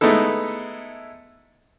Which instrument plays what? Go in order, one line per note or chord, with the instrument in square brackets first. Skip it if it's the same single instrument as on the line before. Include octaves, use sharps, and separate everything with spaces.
[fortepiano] G#3 A3 B3 D#4 E4 A4